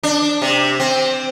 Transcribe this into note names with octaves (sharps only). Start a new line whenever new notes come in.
D4
C3
C4